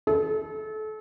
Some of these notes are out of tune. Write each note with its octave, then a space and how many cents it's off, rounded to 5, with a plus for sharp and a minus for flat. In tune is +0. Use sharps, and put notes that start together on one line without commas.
A4 -35